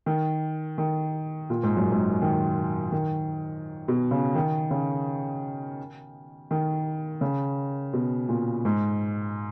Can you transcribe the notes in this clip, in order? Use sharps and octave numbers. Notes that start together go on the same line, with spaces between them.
D#3
D#3
A#2
G#2
F#2
G#2
D#3
D#3
B2
C#3
D#3
C#3
D#3
C#3
B2
A#2
G#2